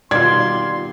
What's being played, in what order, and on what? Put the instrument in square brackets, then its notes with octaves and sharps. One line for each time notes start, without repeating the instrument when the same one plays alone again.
[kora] B2 D#3 G3 [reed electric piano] F4 D5 [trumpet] C6 [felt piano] G#6